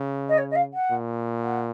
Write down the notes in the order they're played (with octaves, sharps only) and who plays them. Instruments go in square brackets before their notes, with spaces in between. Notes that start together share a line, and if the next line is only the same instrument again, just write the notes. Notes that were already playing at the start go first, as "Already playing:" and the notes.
Already playing: [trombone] C#3
[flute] D#5
C#5
D#5
F5
F#5
[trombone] A#2
[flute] F#5